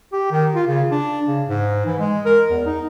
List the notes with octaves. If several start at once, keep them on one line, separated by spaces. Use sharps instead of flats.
G4
D#3
F4
C#3
D4
C#3
G#2
E3
G#3
A#4
E2
D#4